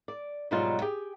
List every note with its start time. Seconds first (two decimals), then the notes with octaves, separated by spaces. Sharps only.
0.08 D5
0.51 G#2 B2 F#3 G3 D#4 F4
0.82 G4 G#4 G5